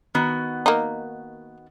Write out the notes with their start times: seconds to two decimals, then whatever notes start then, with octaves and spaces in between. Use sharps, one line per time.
0.15 D#3 B3 F#4
0.66 A#3 D#4